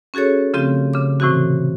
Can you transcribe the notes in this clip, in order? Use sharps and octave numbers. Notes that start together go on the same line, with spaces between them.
C#4 F#4 G#4 A4 C#5
C#3 F3 A3 C4 F4 G4
C#3 D6
A2 C3 E3 C4 F#4